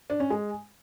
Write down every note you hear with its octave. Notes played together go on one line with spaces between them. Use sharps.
D4
C#4
G#3